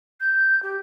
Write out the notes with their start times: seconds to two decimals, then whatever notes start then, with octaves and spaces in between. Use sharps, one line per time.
0.20 G6
0.63 G4